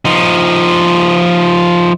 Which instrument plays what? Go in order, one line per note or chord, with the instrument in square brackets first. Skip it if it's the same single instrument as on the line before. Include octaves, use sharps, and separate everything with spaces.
[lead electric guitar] F3 D#4